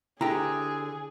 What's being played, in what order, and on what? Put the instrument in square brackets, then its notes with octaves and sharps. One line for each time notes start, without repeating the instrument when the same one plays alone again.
[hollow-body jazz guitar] D3 G4 [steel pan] E4 A#5 [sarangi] G#4